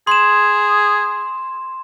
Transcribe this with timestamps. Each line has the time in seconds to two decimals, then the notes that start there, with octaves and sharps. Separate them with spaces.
0.07 G#4 C6 E7